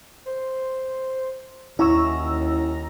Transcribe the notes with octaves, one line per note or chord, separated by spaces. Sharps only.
C5
D#2 C#4 E4 F#4 C#5 A#5 E6